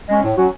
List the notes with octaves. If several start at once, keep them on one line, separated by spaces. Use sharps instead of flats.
G#3 C#4
A2
F#3 C#4 F#4